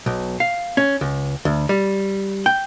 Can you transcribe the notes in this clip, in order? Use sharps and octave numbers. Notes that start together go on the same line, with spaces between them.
B1
F5
C#4
C#2
D2
G3
G5